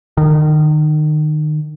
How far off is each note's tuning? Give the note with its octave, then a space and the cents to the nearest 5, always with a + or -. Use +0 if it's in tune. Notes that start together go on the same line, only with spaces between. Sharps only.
D#3 -30